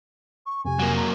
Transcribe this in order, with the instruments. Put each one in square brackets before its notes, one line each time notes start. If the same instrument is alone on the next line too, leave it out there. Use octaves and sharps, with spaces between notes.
[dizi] C#6
[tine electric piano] F2 C3 [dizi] G#5
[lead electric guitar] F#3 A#3
[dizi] A#5